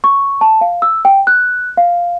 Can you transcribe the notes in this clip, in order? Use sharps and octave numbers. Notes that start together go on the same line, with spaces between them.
C#6
A5
F5
E6
G5
F#6
F5